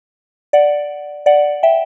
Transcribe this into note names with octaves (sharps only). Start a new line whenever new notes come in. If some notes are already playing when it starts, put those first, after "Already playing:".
D5 F#5
D5 F#5
E5 G5